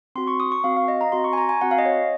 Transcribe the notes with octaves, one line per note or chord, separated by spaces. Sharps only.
C4 F#4 C6
C#6
D#6
C#6
C4 F#4 F5
F5
D#5
A#5
C4 F#4 C6
C#6
G#5
A#5
G#5
C4 F#4 F#5
F5
D#5
C#5